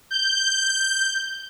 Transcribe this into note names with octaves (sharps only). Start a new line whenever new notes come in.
G6